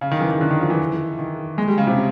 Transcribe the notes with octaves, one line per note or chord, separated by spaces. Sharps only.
C#3
D#3
E3
D#3
D3
D#3
F3
E3
D#3
G#3
G3
C#3
C3